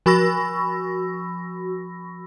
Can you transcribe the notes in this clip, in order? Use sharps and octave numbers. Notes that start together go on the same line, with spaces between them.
F3 F#4 B5 C#6 E6 A#6